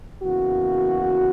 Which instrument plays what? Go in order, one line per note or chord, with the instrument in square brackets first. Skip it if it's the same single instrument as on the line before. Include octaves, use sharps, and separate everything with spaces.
[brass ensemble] E2 C#3 E3 A#3 F#4